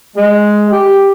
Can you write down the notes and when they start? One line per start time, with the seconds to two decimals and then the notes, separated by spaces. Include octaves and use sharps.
0.16 G#3
0.70 G4